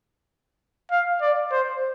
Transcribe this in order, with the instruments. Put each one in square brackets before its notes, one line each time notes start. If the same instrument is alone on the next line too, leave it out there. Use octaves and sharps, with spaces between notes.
[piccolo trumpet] F5
D5
C5